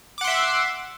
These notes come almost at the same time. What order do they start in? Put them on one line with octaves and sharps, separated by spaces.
D6 F#5 C6 E5